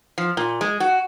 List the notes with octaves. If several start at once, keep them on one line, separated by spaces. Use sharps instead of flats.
F3
A#2
G#3
F#4